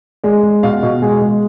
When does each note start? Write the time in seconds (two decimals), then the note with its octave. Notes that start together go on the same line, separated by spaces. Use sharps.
0.24 G#3 D5
0.43 G#3
0.63 B2 F5
0.83 B2
1.02 G#3 G#4
1.22 G#3